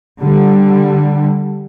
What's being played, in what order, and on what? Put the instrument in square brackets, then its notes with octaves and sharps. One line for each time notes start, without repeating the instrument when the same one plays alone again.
[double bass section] D3 G3